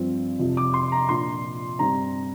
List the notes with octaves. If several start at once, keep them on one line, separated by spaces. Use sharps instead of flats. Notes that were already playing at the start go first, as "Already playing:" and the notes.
Already playing: G2 F3 C4
F2 C3 F3
D6
C6
A#5
A#2 F3 D4 C6
G2 G3 C4 A#5